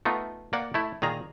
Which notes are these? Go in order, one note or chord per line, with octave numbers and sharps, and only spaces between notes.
A3 B3 D#4 F4
A#3 D5 F#5
A3 E4
A#2 D#3 G#4 A#5